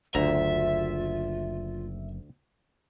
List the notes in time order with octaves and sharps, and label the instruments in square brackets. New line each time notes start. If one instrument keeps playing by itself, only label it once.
[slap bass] F#1 [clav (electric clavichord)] D2 A#5 [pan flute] F4 [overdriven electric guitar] E5